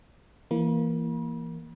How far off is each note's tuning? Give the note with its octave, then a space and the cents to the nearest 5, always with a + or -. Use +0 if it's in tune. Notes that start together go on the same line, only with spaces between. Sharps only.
E3 +15 A#3 +0 B5 -40